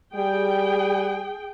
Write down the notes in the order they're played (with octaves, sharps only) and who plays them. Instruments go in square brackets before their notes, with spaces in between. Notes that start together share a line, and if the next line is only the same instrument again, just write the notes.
[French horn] G3 [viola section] G#4 G5